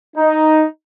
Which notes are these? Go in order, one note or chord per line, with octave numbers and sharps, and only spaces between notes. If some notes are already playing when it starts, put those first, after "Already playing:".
D#4